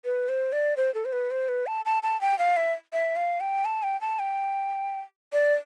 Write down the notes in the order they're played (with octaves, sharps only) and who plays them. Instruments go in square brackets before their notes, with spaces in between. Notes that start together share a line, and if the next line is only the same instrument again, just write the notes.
[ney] B4
C5
D5
C5
A4
C5
B4
C5
B4
A5
A5
A5
G5
F5
E5
E5
F5
G5
A5
G5
A5
G5
D5